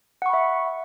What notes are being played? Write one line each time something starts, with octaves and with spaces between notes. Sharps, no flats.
E5 F#5 B5 C#6